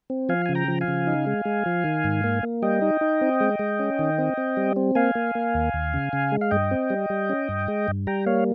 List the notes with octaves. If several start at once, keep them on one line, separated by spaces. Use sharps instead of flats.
C4
F3 F5 G#5
C#3 G#5
G5 A#5
F3
F5 G#5
C#3
D#4
G#3
G#3
F3
D#3
G#2
A#3
A#3
G3 D#5 G5
D#4
D#4
C4
G#3
G#3
C#4
D#3
C4
C4
G3
C4
A#3 F5 G#5
A#3
A#3
D#2
D#2
C#3
C#3
G#3
F5
G2 D#5 G5
C4
G3
G3
C#4
G2
G#3
G2
G3 G5 A#5
A#3 C#5 F5